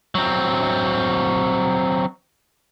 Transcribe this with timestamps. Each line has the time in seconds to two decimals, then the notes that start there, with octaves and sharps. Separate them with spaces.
0.15 F#3 C4